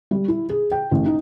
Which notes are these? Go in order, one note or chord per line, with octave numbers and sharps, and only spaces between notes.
G3
E4
G#4
G5
A1
D#4